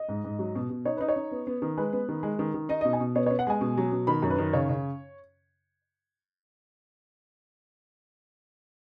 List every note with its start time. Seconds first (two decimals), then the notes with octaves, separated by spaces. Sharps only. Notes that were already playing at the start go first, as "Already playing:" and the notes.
Already playing: D#5
0.09 G#2
0.24 G#2
0.39 F#3
0.55 B2
0.70 B2
0.85 D#4 C#5
0.97 D#4 B4
1.08 C#5
1.16 D#4
1.31 B3
1.47 B3
1.62 D#3
1.77 G#3 B4
1.93 B3
2.09 D#3
2.23 G#3
2.39 D#3
2.54 D#3
2.69 D#4 D#5
2.81 D#5
2.85 B2
2.93 G#5
3.00 B2
3.15 B3 C#5
3.26 C#5
3.31 B3
3.39 F#5
3.47 G#3 G#5
3.61 B2
3.77 F#3
3.92 B2
4.07 D#3 B5
4.22 F#2
4.30 B4
4.38 D#3
4.53 C#3 C#5
4.69 C#3